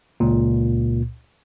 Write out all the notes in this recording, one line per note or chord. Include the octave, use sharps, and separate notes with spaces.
C#2 A#2